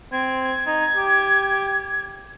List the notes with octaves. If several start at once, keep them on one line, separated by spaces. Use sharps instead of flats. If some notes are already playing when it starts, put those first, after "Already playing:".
C4 G#6
G#6
D#4
G4